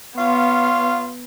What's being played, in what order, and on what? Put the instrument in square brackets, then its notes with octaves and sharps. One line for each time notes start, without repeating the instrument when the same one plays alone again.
[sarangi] B3 [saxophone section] F4 C#5 F5 [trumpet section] C6